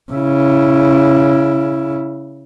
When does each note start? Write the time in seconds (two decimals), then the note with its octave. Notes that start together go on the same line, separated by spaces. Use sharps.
0.12 C#3 E4